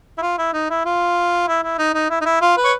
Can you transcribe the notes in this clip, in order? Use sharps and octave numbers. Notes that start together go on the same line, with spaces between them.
E4
F4
E4
D#4
E4
F4
E4
E4
D#4
D#4
E4
D#4
E4
F4
B4
C#5